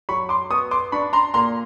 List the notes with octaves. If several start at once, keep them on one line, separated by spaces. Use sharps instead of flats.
F#3 B5 C#6
C6 D6
B3 C#6 D#6
C6 D6
D4 B5 C#6
A#5 C6
A#2 A#5 C6